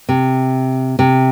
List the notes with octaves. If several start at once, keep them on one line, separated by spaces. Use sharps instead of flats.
C3
C3